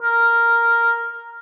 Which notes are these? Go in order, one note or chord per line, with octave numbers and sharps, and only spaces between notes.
A#4